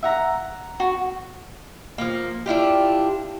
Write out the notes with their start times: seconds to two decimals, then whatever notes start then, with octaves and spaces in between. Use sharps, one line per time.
0.03 E5 F#5 A#5
0.80 F#4
1.98 F3 A#3
2.46 D4 E4 F4 G4